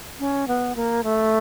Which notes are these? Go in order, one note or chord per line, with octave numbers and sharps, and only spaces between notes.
C#4
B3
A#3
A3